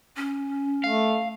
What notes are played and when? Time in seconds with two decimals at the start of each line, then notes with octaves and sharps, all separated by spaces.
0.16 C#4
0.84 A3 F5